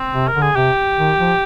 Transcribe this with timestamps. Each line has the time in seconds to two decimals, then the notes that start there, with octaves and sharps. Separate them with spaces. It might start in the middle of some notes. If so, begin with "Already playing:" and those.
Already playing: C4
0.14 C3
0.28 A#4
0.35 D3
0.42 G#4
0.55 C3 G4
0.98 D#3
1.18 F3